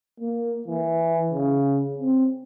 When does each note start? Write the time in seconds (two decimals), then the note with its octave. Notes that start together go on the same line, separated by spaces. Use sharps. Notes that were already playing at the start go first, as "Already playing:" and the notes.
0.20 A#3
0.67 E3
1.32 C#3
1.98 C4